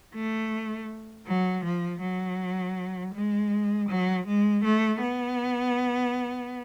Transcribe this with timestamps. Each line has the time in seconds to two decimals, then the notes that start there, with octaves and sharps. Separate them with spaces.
0.14 A3
1.27 F#3
1.64 F3
2.01 F#3
3.14 G#3
3.89 F#3
4.27 G#3
4.64 A3
5.01 B3